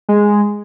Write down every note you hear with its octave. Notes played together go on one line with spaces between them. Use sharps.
G#3